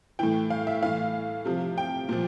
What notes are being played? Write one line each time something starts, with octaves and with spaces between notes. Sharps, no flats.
A2 E3 G5
F5
E5
A2 E3 F5
C3 F3
G5
A#2 F3